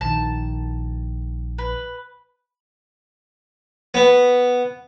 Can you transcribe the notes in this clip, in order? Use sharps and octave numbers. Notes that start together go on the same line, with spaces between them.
A#1 D#3 A5
B4
B3